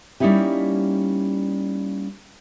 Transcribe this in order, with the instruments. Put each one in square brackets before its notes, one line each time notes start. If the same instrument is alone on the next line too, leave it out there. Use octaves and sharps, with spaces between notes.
[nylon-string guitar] G3 A#3 C#4 D#4 E4 G4